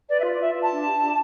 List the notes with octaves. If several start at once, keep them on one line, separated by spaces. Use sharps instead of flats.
B4 D5
E5
F4 D5
F4 E5
F4
A5
D4
G4
D4